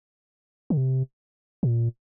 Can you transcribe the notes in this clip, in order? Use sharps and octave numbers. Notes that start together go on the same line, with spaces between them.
D3
C3
A#2